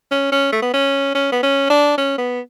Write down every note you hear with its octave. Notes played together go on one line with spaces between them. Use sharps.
C#4
C#4
A3
B3
C#4
C#4
B3
C#4
D4
C#4
B3